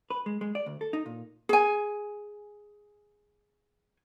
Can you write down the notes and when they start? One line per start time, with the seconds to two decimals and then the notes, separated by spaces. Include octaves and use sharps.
0.10 B4
0.26 G#3
0.41 G#3
0.55 D5
0.66 D2
0.81 A4
0.93 D#4
1.06 A#2
1.49 G#4 G#5